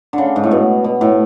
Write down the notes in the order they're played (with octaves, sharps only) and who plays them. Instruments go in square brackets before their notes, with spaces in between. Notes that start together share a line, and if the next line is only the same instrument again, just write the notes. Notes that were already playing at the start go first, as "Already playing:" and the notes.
[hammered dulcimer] D3
C#3
G#2
A2
B2
B2
A2